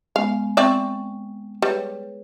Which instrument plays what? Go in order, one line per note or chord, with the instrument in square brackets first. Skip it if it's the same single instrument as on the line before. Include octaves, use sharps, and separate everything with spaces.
[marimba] G#3 B3 C#4 [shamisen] F5
[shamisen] C4 D5 E5 [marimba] G5 C#6
[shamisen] G3 [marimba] G#4 B4 C#5